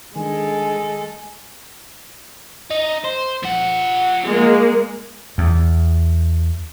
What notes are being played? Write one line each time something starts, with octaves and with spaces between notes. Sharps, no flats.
D#3 G#3 D4 A4 G#5
D#4
C5
F3 F#5
G#3 A#3
E2